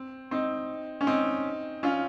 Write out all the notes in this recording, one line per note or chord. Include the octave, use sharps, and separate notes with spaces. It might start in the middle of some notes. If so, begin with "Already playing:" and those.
Already playing: C4
C4 D#4
C#4
C4 D#4
C#4 F4